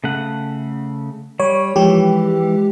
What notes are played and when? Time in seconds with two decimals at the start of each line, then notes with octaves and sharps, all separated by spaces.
0.04 C#3 A3 F#5
1.40 G3 C#5
1.76 E3 F3 G#3 G4